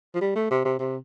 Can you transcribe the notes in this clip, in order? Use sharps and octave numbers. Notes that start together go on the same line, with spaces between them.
F3
G3
A3
C3
C3
C3